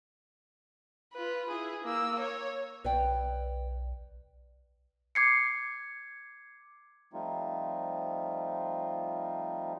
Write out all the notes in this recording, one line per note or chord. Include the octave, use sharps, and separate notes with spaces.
F4 B4
E4 G#4
A#3 E6
C#5
B1 B4 D5 G5
D6 G#6 C7 C#7
F3 G3 A3 C4 D#4 F4